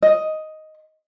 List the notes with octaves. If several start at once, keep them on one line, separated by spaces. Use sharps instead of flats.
D#5